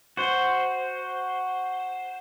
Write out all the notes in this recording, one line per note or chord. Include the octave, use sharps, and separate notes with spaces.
F#4 C5